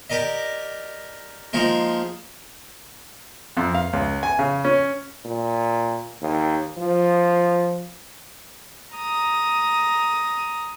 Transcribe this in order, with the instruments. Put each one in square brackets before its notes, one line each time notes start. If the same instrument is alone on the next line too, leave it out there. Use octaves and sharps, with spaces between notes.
[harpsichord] G4 A#4 D5 D#5
F3 G#3 A#3 D#4 A#4
[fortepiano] F2
F5
C#2
G#5
C#3
C#4
[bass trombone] A#2
D#2
F3
[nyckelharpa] A#5 D#6